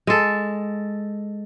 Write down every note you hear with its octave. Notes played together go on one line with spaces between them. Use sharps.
G#3 A4